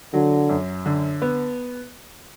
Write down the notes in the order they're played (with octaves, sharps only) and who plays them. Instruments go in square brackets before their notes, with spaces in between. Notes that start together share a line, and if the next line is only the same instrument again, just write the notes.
[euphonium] D3 [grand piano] F#3
[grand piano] F#2
D3
B3